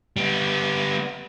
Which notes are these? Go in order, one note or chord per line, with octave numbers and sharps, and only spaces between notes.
G3 B3